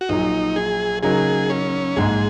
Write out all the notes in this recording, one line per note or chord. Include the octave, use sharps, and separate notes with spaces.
F#4
A#1 A#2 F#3 D#4
G#4
C#3 F#3 D#4 G#4 A#4
C#4
A#1 G#2 G#3 G#4